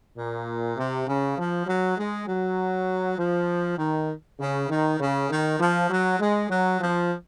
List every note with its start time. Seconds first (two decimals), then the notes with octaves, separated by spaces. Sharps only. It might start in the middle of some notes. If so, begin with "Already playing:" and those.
0.17 A#2
0.77 C3
1.07 C#3
1.37 F3
1.67 F#3
1.97 G#3
2.27 F#3
3.18 F3
3.78 D#3
4.39 C#3
4.69 D#3
4.99 C#3
5.29 D#3
5.59 F3
5.90 F#3
6.20 G#3
6.50 F#3
6.80 F3